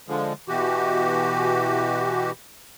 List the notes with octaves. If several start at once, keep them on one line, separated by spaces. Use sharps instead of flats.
D3 F3 G#3
B2 E3 F#4 G4